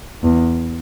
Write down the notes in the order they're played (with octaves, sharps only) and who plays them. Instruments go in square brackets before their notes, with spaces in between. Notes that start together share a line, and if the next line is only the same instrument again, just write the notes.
[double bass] E2